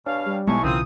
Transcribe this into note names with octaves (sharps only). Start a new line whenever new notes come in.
G2 B2 D4 C#5 F5 G#5
G3
B1 G#3 B3 E4 G#5 A5 C#6
B1 C#3 E3 A#3 C4 F4 D#6